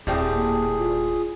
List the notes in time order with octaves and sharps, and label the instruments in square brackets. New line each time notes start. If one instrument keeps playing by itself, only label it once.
[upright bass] D#1 [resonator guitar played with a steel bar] A2 G3 C4 [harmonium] G#4
[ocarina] A#3
F4